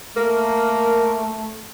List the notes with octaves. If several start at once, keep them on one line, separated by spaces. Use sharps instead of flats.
A3 A#3 A#4